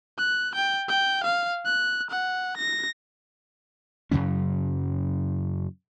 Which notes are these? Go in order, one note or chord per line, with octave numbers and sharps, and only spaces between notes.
F#6
G5
G5
F5
F#6
F#5
A#6
F#2 C#3 F#3 C#4